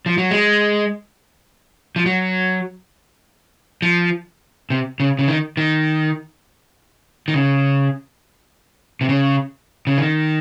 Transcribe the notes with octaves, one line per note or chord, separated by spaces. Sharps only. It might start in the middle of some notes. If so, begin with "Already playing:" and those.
F3
F#3
G#3
F3
F#3
F3
C3
C#3
C#3
D#3
D#3
D#3
C#3
C3
C#3
C#3
D#3